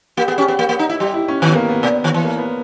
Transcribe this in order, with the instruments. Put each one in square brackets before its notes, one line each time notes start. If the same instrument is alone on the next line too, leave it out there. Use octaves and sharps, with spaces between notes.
[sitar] A#3 [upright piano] G4
[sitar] B3 [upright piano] G#4
[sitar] C#4 [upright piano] G4
[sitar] B3
A#3
A#3
D#4
E4
[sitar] G3 [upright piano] G4
[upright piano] E4
C#4
[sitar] D#3 [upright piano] B3
[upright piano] A#3
B3
[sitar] B2
D#3
E3
[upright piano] A#3
B3